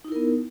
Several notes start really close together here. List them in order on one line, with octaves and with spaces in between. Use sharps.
D#4 E4 A#4 B3